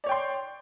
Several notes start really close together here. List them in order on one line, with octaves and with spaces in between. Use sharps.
D5 C#5 G5 C6